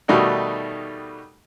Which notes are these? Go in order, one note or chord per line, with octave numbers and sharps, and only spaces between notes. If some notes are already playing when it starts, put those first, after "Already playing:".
B2 D#3 G3 A3 D#4 F#4